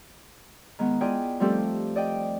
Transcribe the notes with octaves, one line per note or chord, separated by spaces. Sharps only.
D#3 G#3 B3
E4 F4 G#4 D5 D#5 G5
F3 G3 A3 C4 G4 A4
D5 D#5 G5